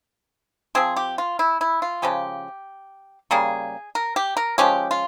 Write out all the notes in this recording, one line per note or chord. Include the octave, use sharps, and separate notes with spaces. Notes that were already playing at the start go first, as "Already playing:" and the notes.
F3 C4 G#4
G4
F4
E4
E4
F4
C#3 F3 G#3 G4
C#3 G3 A#3 G#4
A#4
G4
A#4
F3 G#3 C#4 G4
F4